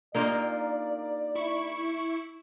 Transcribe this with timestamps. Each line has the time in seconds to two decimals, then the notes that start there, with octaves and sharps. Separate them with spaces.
0.15 A#3 D4 D#4 F4 G4 A#4 D5
1.35 E4 C#6